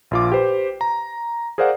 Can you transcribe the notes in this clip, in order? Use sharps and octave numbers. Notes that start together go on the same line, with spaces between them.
A#1 F4 D6
G4 B4 C5
A#5
G#4 A#4 C5 D5 F5 F#5